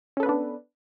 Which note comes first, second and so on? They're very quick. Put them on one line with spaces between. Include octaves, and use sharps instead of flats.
C#4 A4 B4 B3 D4